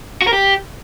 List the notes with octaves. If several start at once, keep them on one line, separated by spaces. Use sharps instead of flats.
F#4
A#4
G4